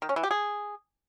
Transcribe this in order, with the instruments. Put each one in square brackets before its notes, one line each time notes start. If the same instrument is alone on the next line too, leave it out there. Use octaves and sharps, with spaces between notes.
[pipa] D#3
C#4
E3
G4
G#4